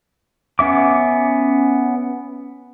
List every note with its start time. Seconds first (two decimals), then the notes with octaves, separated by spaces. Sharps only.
0.59 B3 C#4 E5 D6